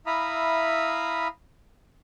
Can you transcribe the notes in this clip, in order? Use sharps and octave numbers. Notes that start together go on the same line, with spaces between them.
E4 E5 F5 A#5 B5 D#6